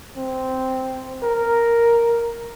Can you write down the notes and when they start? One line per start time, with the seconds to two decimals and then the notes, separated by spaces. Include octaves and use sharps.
0.16 C4
1.23 A#4